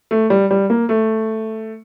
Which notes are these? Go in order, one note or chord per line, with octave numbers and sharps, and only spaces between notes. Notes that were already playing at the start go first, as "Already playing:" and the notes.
A3
G3
G3
A#3
A3